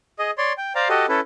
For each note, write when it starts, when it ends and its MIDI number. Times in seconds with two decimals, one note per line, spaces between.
0.19 0.31 68
0.19 0.31 75
0.38 0.53 73
0.38 0.53 74
0.38 0.53 84
0.58 0.73 79
0.75 0.88 72
0.75 0.88 74
0.75 0.88 77
0.75 0.88 82
0.89 1.06 66
0.89 1.06 67
0.89 1.06 69
0.89 1.06 75
1.09 1.20 61
1.09 1.20 64
1.09 1.20 69
1.09 1.20 71